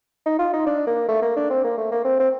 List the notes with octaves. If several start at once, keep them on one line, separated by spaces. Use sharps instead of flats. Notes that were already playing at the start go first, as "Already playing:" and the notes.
D#4
F4
D#4
D4
A#3
A3
A#3
D4
C4
A#3
A3
A#3
C4
C4